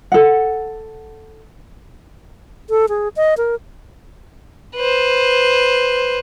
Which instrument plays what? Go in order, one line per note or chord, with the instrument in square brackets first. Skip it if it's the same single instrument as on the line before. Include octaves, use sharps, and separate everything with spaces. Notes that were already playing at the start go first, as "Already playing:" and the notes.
[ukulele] A4 F#5
[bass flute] A4
G#4
D#5
A#4
[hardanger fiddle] B4 C5